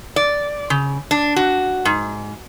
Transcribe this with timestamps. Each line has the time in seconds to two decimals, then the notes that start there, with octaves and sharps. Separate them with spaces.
0.16 D5
0.70 C#3
1.11 D4
1.36 F#4
1.85 G#2